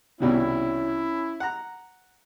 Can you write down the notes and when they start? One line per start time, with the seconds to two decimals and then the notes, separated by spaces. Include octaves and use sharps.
0.20 C2 B2 D#3 C#4 E4
1.40 F#5 A#5